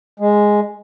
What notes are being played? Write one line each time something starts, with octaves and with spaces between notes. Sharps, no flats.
G#3